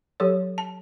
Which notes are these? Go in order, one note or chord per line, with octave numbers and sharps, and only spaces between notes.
F#3 G4 A4 C#5
A5